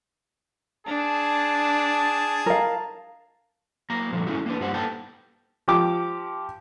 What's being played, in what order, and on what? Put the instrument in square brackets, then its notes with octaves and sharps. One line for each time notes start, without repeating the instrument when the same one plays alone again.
[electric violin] D4 [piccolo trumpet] G#4 [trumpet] A5
[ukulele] A#4 F5
[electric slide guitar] F#3 A#3 A#5
A#2 D3 F3 G3 A3
G#3 A3 C#4 D#4 E4 F#4
A#3 D4 B4
G2 F4 G4 C5 F#5
A#3 D#4 A4 B4 G5 A5
[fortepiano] F3 G4 D6